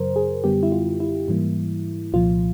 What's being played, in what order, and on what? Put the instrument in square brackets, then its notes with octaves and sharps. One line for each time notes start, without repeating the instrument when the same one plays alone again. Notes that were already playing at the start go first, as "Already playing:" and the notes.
Already playing: [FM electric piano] F#2 C#3 F#3 A#4 C5
G#4
F#2 D3 G3 B3 G4
E4
F4
E4
G#2 E3 G3 A#3
C2 A#2 F3 F4